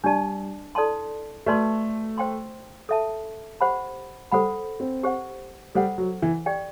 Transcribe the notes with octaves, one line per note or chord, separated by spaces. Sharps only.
G3 D4 G4 D5 A5
E4 A4 D5 A5 C6
A3 F#4 B4 D5 A5 C6
C5 G5 C6
A4 E5 A5
G4 C5 F#5 B5
G3 A4 C5 F#5 B5
C4
G4 C5 F#5
G3 A4 C5 F#5
F#3
E3
G4 D5 G5